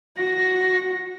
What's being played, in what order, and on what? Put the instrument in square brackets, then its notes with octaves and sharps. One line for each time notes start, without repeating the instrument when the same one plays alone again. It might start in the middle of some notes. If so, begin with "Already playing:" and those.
[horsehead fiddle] F#4 [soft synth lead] A#6